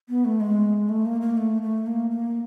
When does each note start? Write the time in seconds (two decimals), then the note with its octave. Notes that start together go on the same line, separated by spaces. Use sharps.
0.09 B3
0.25 A3
0.40 G#3
0.89 A3
1.06 A#3
1.21 A#3
1.37 A3
1.62 A3
1.87 A#3
2.11 A#3